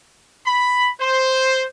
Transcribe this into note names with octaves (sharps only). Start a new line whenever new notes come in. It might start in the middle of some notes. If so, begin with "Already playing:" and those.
B5
C5